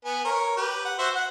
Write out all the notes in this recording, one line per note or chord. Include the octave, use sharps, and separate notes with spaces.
B3 G#5
A#4 C#5
G4 B4
F#5
F#4 C5 E5
F#5